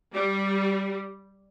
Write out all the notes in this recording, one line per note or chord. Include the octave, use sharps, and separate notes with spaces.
G3